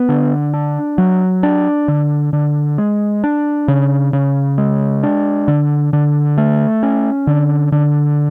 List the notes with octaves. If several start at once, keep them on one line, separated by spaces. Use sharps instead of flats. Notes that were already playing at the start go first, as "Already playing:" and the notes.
Already playing: B3
D3
D4
F#3
D4
D3
D3
G#3
D4
C#3
C#3
G#3
D4
D3
D3
A3
C#4
D3
D3